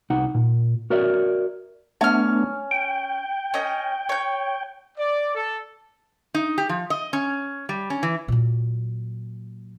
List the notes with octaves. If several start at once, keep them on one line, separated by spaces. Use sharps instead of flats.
C2 D#4 F#5
A#2
F#4 A#4 C#5 D5 E5
A3 B3 C#4 D4 F6
G5
C#4 D#5
C#5 G6
D5
A4
D#4
G4
F3
D#5
C#4
G3
C#4
E3
A#2 F#3